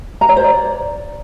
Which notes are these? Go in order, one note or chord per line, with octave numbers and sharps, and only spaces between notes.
A#5
C#5
C5
D5